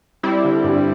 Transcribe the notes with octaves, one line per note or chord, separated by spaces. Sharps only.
G3 C4 E4
D3
G2